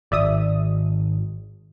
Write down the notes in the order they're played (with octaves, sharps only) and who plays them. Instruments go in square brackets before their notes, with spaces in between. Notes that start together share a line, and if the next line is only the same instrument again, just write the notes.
[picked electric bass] G#1 [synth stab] D5 E5 D#6